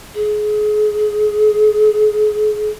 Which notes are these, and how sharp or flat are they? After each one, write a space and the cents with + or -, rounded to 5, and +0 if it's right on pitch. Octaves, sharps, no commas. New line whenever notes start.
G#4 +30